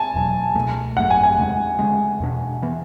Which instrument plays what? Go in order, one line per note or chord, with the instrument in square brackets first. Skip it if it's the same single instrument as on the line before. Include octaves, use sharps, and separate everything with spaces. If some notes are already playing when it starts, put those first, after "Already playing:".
Already playing: [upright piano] G#5 A5
[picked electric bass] E1 E2 B2 F#3
C#2 B2 A3
[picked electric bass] G#1 F#2 D3 A3 [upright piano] F#5
[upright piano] G#5
G#5
[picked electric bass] E2 C#3 G#3 D4
D2 D3 G#3 C#4
E2 B2 A3 D4
E3 B3